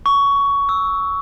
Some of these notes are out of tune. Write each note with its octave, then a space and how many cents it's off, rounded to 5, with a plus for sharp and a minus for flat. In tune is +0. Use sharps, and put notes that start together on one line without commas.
C#6 +15
E6 -15